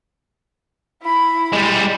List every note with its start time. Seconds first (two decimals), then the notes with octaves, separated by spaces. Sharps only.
1.02 E4 B5
1.53 G3 G#3